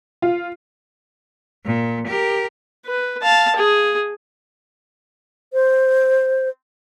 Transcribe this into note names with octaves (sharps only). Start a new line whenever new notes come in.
F4
A#2
G4 A#4
B4
F5 A5
G#4
C5